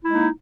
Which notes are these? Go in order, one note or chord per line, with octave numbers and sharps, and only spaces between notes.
G#3 A#3 D#4 E4